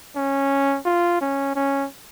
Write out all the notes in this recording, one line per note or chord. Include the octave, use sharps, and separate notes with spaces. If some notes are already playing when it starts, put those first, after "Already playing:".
C#4
F4
C#4
C#4